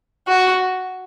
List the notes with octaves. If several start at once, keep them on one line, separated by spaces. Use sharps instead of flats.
F#4